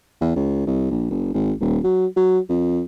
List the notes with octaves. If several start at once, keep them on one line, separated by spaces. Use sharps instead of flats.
E2
C#2
C2
A#1
F#1
G#1
D#1
F#3
F#3
F2